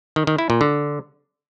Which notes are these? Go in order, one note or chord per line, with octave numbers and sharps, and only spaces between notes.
D#3
D#3
E4
A#2
D3